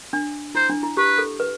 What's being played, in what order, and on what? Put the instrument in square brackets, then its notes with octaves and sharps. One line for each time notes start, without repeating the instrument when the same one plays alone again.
[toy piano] D4
[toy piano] E4 [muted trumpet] C5
[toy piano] D4
E4
[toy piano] G4 [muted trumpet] B4
[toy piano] A4
B4